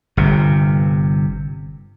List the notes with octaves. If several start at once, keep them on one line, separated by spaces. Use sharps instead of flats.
G1 C3